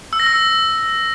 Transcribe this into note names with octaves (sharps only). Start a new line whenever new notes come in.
E6
A#6
E6